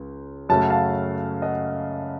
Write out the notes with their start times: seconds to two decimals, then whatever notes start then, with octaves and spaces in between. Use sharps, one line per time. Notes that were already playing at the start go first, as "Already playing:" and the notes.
Already playing: C#2 C#3
0.49 F#2 C#3 A3 A5
0.60 F#5
0.70 F5 A5
1.42 D#5 F#5